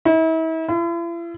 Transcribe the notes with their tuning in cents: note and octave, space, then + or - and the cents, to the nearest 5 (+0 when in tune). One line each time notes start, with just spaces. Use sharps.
E4 -40
E4 +45